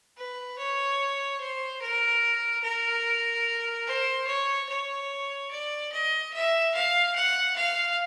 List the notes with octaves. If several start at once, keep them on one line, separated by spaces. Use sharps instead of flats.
B4
C#5
C5
A#4
A#4
C5
C#5
C#5
D5
D#5
E5
F5
F#5
F5